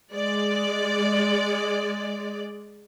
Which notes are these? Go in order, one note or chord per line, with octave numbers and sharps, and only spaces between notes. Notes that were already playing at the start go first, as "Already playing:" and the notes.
G#3 D5